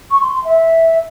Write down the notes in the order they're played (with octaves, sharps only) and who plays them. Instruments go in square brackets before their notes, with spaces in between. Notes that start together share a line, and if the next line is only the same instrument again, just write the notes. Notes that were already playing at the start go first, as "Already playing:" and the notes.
[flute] C#6
C6
C6
E5